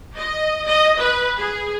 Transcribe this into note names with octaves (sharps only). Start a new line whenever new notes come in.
D#5
D#5
B4
G#4